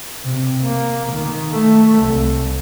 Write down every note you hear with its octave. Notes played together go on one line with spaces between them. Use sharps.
C3
A#3
D#3
A3
C2